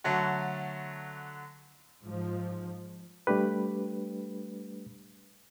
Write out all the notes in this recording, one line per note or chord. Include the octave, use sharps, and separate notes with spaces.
D3 F#3 A3
G#2 F3
G3 A3 D4 G4 B4